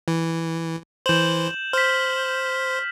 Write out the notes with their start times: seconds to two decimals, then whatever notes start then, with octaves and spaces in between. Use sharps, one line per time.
0.08 E3
1.06 E3 C5 G6 E7 F#7
1.73 C5 F6 B6